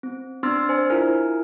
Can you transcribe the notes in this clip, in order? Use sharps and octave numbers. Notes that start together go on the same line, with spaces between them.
C4
C4 D4 C6 E6 F6 A6
D4 C5 G#5
E4 F4 A#4 G#5 F6